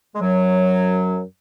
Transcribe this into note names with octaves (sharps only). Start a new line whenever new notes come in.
G#3
F#2 F#3